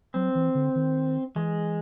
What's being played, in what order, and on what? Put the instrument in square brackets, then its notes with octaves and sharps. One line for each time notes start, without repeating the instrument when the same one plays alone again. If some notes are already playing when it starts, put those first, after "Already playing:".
[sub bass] F#3 [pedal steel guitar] C4
[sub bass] E3
D3
D#3
[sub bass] E3 [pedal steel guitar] G#3